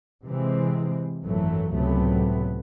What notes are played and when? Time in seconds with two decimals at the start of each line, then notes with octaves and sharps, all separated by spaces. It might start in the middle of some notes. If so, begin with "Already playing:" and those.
0.25 C3 E3 G#3 C4
1.24 G#1 F#2 E3 F#3 A3
1.74 C#2 A2 C3 F#3 A3 B3